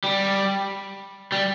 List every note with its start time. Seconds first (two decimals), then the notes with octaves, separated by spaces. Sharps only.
0.04 G3
1.32 G3